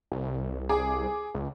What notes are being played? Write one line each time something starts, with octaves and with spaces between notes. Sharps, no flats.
C2
G#4 D6
C#2